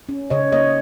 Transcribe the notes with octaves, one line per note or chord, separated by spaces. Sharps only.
C#4
C#3 C#5 D#5
A#3 C#5 D#5